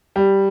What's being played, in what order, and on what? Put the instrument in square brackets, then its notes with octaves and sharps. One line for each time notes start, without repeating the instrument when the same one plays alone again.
[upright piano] G3